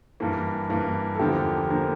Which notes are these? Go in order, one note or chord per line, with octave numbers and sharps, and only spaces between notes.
G2 E3 A#3
G2 E3 A#3
A4
E2 D3 F3 A#3 G4
D3 F3 A#3 A#4